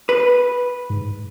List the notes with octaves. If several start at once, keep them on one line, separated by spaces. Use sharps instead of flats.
B4
G#2